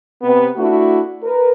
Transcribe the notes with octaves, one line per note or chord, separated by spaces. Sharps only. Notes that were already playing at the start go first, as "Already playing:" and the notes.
C3 B3
A3 D4 E4 F#4
A#4 B4